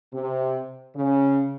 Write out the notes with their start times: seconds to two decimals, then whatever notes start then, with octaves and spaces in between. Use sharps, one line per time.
0.13 C3
0.95 C#3